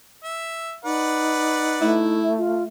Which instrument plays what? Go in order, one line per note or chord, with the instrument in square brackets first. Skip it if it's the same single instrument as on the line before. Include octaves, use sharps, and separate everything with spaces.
[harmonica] E5
[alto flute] D#4 [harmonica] B4 D5 F#5
[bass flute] A3 [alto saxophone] E4
[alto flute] F4